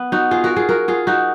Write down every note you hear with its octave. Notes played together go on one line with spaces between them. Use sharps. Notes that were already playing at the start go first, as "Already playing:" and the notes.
Already playing: B3
D#4 F#4
F4 G#4
F#4 A#4
F4 G#4
F#4 A#4
F4 G#4
D#4 F#4